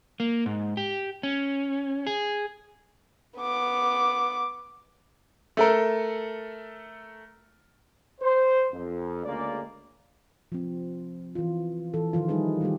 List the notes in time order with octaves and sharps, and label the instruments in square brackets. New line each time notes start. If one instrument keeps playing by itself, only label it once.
[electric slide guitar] A#3
G#2
G4
C#4
G#4
[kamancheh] B3 D6
[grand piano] A3 A4 A#4
[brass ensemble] C5
F2
D2 C#3 G#3 A#3 D5
[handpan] F3 C4
E3 F4
E3 A4
D#3 F3 F4
G3 D#4 E4 G#4 B4
D#3 G3 A3 G4